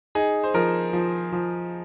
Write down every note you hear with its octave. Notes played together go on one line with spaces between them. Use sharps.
D#4 G#4
C5
F3 A#4
F3
F3